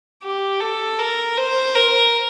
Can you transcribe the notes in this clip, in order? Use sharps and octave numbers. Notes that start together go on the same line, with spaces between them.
G4
A4
A#4
C5
A#4